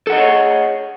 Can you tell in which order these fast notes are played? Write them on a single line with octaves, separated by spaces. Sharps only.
A4 F#5 D#5 G#4 C#5